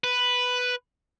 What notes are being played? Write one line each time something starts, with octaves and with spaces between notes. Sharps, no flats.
B4